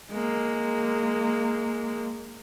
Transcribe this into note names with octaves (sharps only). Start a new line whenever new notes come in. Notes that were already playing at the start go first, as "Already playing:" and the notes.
G#3 A#3